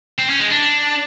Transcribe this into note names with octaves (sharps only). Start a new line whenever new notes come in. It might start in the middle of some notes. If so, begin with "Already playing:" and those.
C4
C#4
G#3
D4